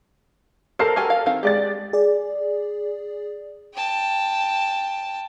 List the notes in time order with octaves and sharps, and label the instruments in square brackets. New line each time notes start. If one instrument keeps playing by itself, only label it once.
[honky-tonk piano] A4 A#4 C7 [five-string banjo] C5 A5
[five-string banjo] F#4 G4 G#5
F5
D#3 C4 F5
[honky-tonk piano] G#3 D5 A6 [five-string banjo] G4
[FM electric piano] G#4 D5
[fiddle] G5 A5